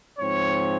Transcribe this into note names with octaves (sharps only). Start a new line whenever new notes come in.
G#2 F3 C4 C#5